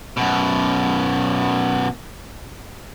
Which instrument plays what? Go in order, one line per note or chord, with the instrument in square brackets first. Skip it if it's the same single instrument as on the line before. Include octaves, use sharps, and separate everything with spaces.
[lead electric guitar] F#2 B2